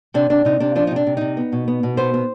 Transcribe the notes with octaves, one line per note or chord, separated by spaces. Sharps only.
C3 D4
C3 D4
C3 D#4
C3 D4
F3 D4
D#4
C3
D4
C3
C3 D#4
B3
B2
B3
B2
B3 C5
B3